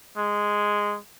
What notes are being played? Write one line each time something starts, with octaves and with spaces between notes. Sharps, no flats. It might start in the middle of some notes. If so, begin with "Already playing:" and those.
G#3